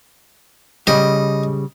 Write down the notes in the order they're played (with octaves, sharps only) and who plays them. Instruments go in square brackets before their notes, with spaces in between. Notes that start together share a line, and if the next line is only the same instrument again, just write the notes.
[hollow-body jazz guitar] C#3 G3 [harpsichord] D#5